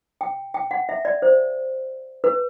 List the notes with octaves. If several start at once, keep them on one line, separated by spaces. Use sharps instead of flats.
G5
G5
F#5
E5
D5
C5
B4